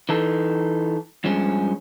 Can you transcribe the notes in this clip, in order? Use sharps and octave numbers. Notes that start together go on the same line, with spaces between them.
E3 D#4 A4
G2 F3 G#3 C#4